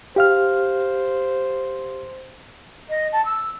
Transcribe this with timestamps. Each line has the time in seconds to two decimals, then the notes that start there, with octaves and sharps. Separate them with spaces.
0.16 G4 C5 F5 F6
2.89 D#5
3.13 A5
3.25 E6